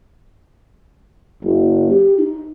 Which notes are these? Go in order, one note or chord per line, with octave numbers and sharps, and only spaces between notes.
F#1
G4
D#4